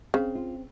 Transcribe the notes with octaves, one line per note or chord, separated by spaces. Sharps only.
C#3 C4
F4